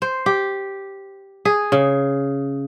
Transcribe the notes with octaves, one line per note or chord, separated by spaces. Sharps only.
C5
G4
G#4
C#3